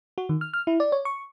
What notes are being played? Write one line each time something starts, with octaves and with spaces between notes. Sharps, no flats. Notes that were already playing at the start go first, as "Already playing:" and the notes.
F#4
D#3
F6
F6
E4
D5
C#5
C#6